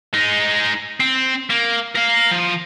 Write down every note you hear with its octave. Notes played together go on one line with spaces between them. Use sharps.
G#3 D#4
C4
A#3
A#4 F5
F3